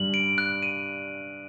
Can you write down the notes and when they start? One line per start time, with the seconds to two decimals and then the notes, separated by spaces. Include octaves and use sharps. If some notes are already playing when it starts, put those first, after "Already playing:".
Already playing: G2 G3 F#7
0.14 D7
0.38 F#6
0.63 D#7